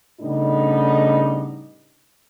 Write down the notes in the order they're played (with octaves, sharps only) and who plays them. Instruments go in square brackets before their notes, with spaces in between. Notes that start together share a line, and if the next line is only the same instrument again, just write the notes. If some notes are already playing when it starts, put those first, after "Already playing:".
[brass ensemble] A2 C#3 G3 B3 D4 D#4